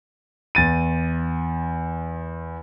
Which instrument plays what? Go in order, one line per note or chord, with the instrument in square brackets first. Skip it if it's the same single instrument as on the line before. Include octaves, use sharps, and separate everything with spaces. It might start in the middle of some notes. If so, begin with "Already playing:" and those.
[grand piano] E2 A6 D#7